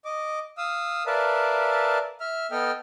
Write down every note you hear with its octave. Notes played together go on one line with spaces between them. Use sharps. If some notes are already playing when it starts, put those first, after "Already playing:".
D#5 D6
F5 D#6 E6
A#4 B4 D5 E5 F5 A5
E5 F6
B3 A4 D#5 G5 F6